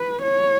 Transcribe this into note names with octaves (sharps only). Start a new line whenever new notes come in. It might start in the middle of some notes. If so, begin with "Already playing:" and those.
Already playing: B4
C#5